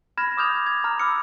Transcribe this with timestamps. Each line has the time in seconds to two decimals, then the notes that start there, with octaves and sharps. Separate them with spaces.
0.17 B5 F6 G#6 A#6 E7
0.37 D6 D#6 F6 G6 G#6 F7
0.66 G#6
0.84 A#5 F6
0.99 B5 D6 E6 F6 C#7